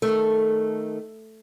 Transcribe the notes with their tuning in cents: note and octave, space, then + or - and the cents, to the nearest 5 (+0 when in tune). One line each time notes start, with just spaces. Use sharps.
D#3 +0 A3 -5